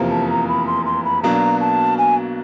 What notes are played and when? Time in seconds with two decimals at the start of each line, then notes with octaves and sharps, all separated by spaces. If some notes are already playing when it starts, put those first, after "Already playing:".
Already playing: F1 E2 C3 F3 A#3
0.11 A5
0.30 A#5
0.48 B5
0.67 C6
0.86 C6
1.04 B5
1.23 B1 B2 F#3 A#3 D4 A#5
1.61 A5
1.98 G#5